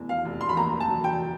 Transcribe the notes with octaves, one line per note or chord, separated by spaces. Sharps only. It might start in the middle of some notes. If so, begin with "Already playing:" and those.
Already playing: F1 E2
F5
F1
C6
B5
D#2 A#5
A5
F#3
G5